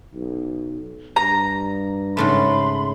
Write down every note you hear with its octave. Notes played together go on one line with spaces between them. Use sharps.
B1
G2 A#5
G#2 C#3 A3 B5 C6